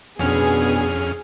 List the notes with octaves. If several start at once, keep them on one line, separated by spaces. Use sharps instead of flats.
F2 B2 B3 C#4 D4 G#4 F6